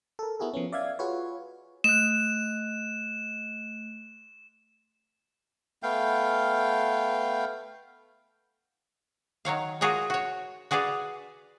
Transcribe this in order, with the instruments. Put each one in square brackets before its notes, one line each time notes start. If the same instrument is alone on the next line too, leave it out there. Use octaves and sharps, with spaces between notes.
[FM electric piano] A4 A#4
B3 E4 F#4 G#4 A#4
F3 B3 C#4
D5 E5 F5 G#6
F4 F#4 G#4 B4 C#5
[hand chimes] A3 F#6 [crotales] E7
[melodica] A3 B3 F5 G5
[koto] D#3 F#3 C#5 F5
F4 F#4 G#4 A#4 C#5
F#4 C#5
F#4 G#4 B4 D5 F5